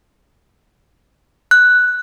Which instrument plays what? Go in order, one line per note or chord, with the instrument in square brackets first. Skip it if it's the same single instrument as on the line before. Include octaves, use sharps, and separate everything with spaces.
[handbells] F#6